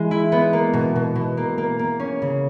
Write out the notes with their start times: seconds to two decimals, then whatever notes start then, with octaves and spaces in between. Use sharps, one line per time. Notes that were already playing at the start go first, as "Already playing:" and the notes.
Already playing: E3 G#3
0.11 E4
0.32 B3
0.53 A#3
0.73 B2
0.96 B2
1.16 B2
1.37 A#3
1.58 A#3
1.79 A#3
2.00 C#4
2.22 C#3